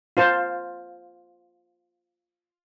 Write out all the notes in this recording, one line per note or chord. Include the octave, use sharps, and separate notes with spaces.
F4 C5 A5